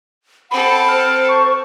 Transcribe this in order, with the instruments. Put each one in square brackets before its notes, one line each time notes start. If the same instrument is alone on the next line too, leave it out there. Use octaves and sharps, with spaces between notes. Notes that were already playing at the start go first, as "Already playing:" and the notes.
[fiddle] C4 A4 [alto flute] F#5 [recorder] B5
[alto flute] C5 [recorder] F6
[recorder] C#6